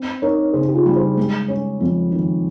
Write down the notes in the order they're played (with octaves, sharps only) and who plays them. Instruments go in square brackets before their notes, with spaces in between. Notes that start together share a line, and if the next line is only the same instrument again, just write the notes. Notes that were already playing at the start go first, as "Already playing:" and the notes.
Already playing: [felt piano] C4
[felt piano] D#4 [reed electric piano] A#4 C#5
[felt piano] C#3 [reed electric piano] G#4 C5
[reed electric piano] G4
F4 G#4
[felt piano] G3
[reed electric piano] G#4 C5
[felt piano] G#3
C#4
F2
D#3